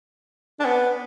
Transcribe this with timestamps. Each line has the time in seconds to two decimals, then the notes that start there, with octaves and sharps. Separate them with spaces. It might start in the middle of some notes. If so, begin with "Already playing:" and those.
0.60 D4
0.65 B3